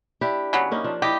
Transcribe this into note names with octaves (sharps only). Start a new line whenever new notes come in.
D4 E4 G4
C#3 F#3 B3
A#3 C#4 D#4
F3 D4
E4 G4 D#5